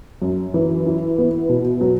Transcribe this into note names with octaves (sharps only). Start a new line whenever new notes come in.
F#2
E3
E4
B3
B2
F#3